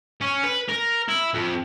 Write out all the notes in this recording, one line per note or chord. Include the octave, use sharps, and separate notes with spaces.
C#4
B4
A#4
E4
F2